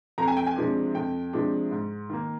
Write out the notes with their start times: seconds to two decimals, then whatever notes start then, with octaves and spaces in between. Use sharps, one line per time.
0.18 F2 A#5
0.27 G#5
0.37 G5
0.47 G#5
0.56 C3 F3 G#3 D4
0.95 F2 G5
1.33 C3 F3 G#3 D4
1.71 G#2
2.09 D#3 A#3